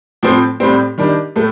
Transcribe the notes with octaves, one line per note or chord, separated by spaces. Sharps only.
A2 F3 C4
A2 G3 C4
D#3 G3 D4
A2 A3